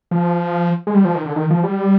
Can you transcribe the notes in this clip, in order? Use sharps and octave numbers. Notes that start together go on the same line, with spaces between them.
F3
G#3
G3
F3
D#3
D3
D#3
F3
G3